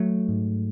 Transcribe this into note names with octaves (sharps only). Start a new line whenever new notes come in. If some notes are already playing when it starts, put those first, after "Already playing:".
Already playing: F#3 A3
G#2